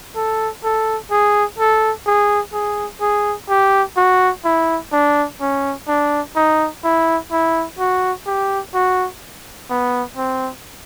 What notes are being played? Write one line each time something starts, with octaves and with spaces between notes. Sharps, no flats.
A4
A4
G#4
A4
G#4
G#4
G#4
G4
F#4
E4
D4
C#4
D4
D#4
E4
E4
F#4
G4
F#4
B3
C4